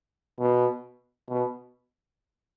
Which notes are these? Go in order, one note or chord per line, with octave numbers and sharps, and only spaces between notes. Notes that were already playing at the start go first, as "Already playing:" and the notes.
B2
B2